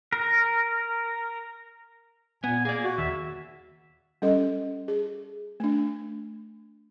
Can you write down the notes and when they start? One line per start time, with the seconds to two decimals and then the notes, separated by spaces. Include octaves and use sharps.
0.13 A#4
2.44 A#2 B3 G#5
2.65 A#3 G#4 D5
2.84 F#4
2.98 D#2 E5
4.22 G3 C#4 A4 D#5
4.88 G#4
5.60 A3 D4